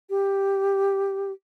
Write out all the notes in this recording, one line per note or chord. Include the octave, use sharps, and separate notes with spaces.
G4